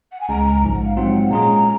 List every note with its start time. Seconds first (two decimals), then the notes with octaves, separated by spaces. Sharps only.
0.12 F#5
0.20 G#5
0.29 C#2 C#3 G#3 A#5
0.46 A#5
0.62 A#1 G#2 F3
0.74 F#5
0.85 F5
0.96 G#2 F#3 C4 F4 F#5
1.14 F#5
1.30 A#2 G#3 C#4 F4 G#4 A#5